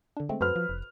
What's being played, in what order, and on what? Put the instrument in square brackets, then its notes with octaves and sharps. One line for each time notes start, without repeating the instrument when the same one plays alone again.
[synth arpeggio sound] D3 D4
G#3 A3 C4
[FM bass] F#2 [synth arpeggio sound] F#4 A4 C5 [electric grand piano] B4 F6
[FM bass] F3
F1